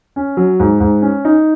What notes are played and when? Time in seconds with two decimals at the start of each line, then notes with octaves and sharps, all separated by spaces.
0.16 C#4
0.37 F#3
0.60 G#2
0.80 G#2
1.02 C#4
1.25 D#4